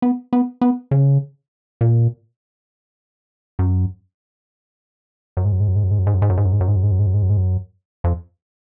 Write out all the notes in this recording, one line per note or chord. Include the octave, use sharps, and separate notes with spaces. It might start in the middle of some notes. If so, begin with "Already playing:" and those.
B3
B3
B3
C#3
A#2
F#2
F#2
G#2
F#2
G#2
F#2
G#2
F#2
G#2
F#2
G#2
F#2
G#2
F#2
G#2
F#2
G#2
F#2
G#2
F#2
G#2
F#2
G#2
F#2
G#2
F#2
G#2
F#2
F2